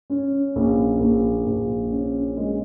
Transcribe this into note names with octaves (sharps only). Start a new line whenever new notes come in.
C#4
A#1
A#1
A#1
C#4
G#3